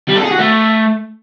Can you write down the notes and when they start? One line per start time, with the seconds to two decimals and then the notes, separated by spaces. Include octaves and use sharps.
0.08 G3
0.16 A4
0.23 G#4
0.31 F#4
0.38 A3